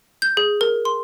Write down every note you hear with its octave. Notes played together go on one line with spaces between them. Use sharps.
G6
G#4
A#4
C6